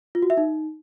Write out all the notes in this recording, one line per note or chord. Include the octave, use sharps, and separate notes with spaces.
F4
F#4
E5
D#4